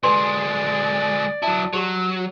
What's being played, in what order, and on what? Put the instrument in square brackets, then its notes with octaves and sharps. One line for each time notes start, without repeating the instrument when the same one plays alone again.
[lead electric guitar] D2 G#3 [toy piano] B4 G#5 C6 [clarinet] D5
[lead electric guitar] F#3 E4 [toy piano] A5
[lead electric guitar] F#3 [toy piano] G4 C#6